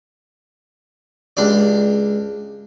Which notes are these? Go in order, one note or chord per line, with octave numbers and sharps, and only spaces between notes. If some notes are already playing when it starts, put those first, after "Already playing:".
C#2 D4 G4 D5